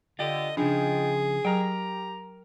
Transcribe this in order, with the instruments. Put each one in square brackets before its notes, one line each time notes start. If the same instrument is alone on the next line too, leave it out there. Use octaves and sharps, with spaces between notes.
[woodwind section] D3 [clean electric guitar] F4 G4 [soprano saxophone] D#5
[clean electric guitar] C#3 F3 [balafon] D4 [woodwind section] D#4 F4 G5 [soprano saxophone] G#4
[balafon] F#3 [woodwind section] G4 A#5 [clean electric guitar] A#4 G5